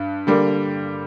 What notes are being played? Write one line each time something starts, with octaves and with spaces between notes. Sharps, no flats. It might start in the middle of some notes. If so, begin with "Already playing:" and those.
Already playing: G2
D3 G3 A#3